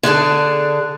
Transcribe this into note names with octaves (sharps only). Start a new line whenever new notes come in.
D3 D4 G#4 A5